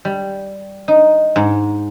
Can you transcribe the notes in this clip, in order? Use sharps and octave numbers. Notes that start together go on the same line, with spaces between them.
G3
D#4
G#2